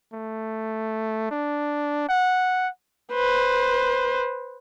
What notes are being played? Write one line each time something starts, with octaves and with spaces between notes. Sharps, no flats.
A3
D4
F#5
B4 C5